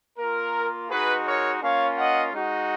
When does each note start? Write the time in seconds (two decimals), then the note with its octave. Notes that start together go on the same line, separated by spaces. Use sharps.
0.19 A#3 F4 A#4
0.90 G#3 D#4 F#4 G#4 B4
1.26 A#4 C#5
1.62 A#3 C#4 F4 C#5 F5
1.97 D#5 F#5
2.33 G#3 D#4 F#4